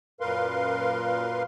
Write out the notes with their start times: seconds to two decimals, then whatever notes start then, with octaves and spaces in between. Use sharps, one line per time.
0.21 F#2 A#2 A#4 B4 F5 C6